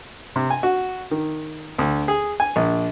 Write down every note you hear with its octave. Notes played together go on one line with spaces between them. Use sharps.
C3
G#5
F#4
D#3
D2
G#4
G#5
A#1